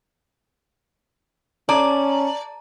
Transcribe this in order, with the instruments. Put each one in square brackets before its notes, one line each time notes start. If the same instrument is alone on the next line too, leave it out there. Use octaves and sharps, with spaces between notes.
[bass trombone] C#4 [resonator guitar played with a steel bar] D5 [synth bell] A5 A#5